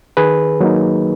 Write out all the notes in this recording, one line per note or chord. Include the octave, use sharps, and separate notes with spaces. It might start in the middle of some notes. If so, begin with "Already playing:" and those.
D#3 G#4 B4
F#3 A#3 D#4